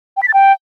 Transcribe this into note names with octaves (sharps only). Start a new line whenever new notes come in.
G5
B6
A6
G5